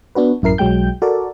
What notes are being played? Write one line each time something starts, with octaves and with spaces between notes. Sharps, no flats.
B3 D4 F#4 B4
A1 F#2 E4 A#4 C7
B1 F#3 G#3 G5 G6
F#4 A4 A#4 D5